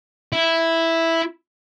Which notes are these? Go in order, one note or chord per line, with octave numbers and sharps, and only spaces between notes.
E4